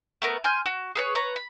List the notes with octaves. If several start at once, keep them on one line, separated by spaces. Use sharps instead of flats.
A3 B3 A#4 B4
G#5 C6 F6 G6
F#4
G#4 B4 C#5
B4 C#5 A#5
B5